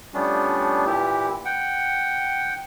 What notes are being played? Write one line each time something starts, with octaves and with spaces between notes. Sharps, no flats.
F3 G3 A3 B3 C#4 D4
A#2 E3 E4 G4
F#5 G5